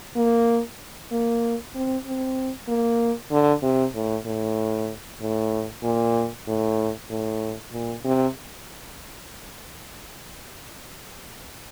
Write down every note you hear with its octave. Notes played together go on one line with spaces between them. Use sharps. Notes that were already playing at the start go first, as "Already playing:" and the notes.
A#3
A#3
C4
C4
A#3
D3
C3
A2
A2
A2
A#2
A2
A2
A#2
C3